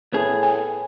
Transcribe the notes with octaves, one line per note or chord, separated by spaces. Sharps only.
A2 B3 G#4
G#5